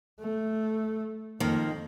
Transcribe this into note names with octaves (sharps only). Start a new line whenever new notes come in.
A3
F2 D#3 F3 A#3